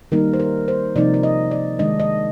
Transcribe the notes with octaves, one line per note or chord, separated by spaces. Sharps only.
D#3 G3 A#3 D#4 A#4
C5
A#4
C5
C3 F3 A#3 D#4 D5
D5
D#5
D5
D#3 G#3 D4 D#5
D#5